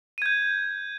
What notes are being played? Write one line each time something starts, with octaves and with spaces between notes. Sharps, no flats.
G6 G#6 D#7